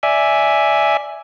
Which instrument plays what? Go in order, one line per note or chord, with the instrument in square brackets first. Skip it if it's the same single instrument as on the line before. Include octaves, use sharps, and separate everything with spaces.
[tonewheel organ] D5 E5 G#5